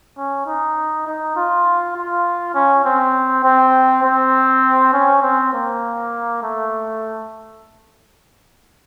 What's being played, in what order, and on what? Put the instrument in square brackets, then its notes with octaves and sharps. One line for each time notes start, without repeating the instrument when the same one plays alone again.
[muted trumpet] C#4
D#4
D#4
F4
F4
C#4
C4
C4
C4
C#4
C4
A#3
A3